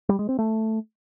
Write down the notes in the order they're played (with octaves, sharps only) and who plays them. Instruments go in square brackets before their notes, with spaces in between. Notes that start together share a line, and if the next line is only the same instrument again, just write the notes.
[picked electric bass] G3
G#3
C4
A3